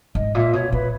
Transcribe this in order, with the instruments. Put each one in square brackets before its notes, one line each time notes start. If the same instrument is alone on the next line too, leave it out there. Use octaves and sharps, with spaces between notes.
[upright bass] G#2 [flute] D#5
[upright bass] A#2 [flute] E5
[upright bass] B2 [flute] C#5
[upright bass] A#2 [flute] B4